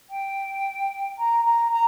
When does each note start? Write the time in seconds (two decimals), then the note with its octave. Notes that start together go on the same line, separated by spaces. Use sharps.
0.10 G5
1.18 A#5
1.45 A#5
1.71 A#5